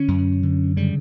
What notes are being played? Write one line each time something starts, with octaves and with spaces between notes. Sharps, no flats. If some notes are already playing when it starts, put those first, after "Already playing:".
Already playing: D3 C#4
F#2
D3
C#3 G3